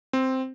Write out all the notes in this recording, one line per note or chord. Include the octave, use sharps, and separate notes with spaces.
C4